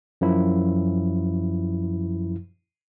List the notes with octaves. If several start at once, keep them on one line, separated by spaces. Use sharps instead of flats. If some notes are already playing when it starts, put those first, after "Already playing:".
F#2 F3 E4